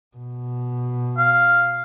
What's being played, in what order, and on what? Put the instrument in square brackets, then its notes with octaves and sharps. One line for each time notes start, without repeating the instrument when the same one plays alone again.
[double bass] B2
[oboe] F5